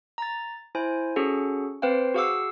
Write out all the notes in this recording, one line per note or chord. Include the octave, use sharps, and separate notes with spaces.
A#5 A6
E4 C5 G#5
C#4 F#4 G#4 A4 F#5
C4 B4 C5 F5 G5
F#4 G#4 F5 F#5 D6 E6